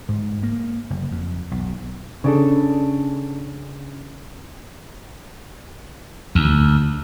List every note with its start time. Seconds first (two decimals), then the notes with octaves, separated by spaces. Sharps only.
0.09 G#2
0.43 A#3
0.90 F#1
1.11 F2
1.51 B1
2.24 C#3 D4 A4
6.35 D2